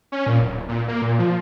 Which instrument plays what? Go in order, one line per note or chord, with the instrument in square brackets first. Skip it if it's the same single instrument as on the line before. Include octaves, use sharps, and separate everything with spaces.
[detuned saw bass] C#4
A#2
D1
A#2
A#3
A#2
F3